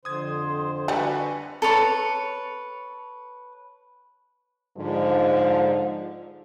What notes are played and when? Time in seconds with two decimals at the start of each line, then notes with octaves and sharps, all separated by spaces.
0.05 F2 D3 C5 C6 D#6 G#6
0.88 D3 G3 F#4 B4 G#5
1.62 A4 B4 C#5
4.77 G#2 D3 F3